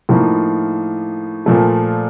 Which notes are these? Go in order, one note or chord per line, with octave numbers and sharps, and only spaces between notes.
A2 F3 A#3 D#4
A#2 F3 A3